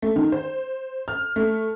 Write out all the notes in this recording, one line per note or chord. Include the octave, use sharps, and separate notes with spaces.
A3
D#3
C5
F6
A3